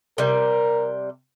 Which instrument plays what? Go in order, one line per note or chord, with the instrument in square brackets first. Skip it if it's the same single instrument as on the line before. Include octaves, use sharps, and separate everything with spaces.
[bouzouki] C3 G3 [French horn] A#4